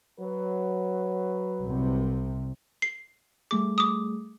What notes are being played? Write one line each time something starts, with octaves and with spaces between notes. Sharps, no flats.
F#3 B4
C2 C3
C7
G3 A3 G#4 D6
D6 D#6